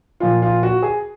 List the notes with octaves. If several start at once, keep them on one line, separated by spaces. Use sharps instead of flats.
A#2 F3 F4
F4
F#4
G#4